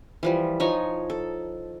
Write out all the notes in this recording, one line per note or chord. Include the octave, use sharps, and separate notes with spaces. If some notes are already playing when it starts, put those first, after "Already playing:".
E3 F3 G3
F3 D#4 C#5 G#5
A4